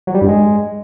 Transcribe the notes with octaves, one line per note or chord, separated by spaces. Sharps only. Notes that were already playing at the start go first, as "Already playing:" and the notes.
F#3
G3
G2
G#3